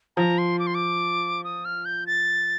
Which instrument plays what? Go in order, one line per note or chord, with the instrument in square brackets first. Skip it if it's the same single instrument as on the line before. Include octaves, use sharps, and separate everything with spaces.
[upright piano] F3 [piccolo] A#5
[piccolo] C6
D6
C6
D6
D#6
F6
G6
A6